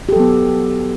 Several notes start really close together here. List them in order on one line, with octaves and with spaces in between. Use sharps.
G4 A4 F#3 B3